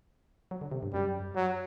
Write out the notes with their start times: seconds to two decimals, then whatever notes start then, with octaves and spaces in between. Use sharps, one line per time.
0.51 F#3
0.61 D3
0.72 C3
0.83 G2
0.94 F#2 G3
1.36 F#3